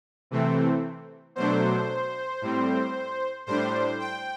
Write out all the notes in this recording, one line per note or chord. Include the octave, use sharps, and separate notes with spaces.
C3 E3 A3 C4
B2 F#3 A3 D4 C5
A2 G3 C4
A2 G3 D4 C5
G5